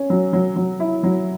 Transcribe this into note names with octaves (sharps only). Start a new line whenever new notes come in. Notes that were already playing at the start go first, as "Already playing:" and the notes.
Already playing: C#4
F#3
F#3
F#3
E4
F#3